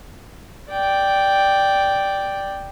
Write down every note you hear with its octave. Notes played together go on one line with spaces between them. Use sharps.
D5 G5